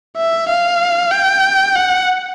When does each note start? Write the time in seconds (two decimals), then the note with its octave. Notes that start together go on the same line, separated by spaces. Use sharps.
0.17 E5
0.49 F5
1.11 G5
1.75 F#5